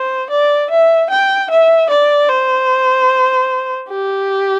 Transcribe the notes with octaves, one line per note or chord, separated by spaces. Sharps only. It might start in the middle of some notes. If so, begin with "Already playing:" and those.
Already playing: C5
D5
E5
G5
E5
D5
C5
G4